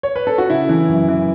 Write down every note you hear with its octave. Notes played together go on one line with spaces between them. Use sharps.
C#5
B4
A4
F#4
C#3 E4
E3
F#2
E3